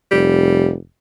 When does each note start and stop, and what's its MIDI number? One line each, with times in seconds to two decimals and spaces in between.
0.12 0.75 29
0.12 0.72 55